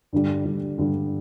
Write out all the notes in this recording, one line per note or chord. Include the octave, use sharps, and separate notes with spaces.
G2 D3 G3
G2 D3 G3
G2 D3 G3